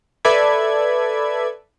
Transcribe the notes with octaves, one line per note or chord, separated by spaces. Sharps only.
A4 B4 D5 E5 B5 G#6